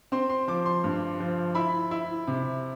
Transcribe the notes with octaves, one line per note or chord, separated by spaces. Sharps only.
C4 C6
C6
F3 D6
C6
G2
F3
E4 B5
E4
C3